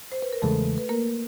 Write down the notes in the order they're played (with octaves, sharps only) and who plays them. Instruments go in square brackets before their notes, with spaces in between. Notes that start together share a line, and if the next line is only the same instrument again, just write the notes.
[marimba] C5
B4
A#4
[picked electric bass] E2 C#3 E3 G#3 [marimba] A3 A4
[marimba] B4
A#3 A#4